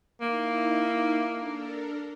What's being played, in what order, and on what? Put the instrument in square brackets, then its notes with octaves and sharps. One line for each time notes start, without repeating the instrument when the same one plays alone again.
[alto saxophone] A#3 [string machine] D#4 E4 E5
[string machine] D4 A4 A#4